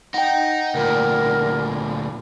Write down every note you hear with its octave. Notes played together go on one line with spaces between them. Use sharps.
D#4 F#5 G5
D2 A#2 A#4